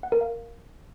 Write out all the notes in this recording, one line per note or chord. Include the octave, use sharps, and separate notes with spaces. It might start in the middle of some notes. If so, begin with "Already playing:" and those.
F#5
A#4
F5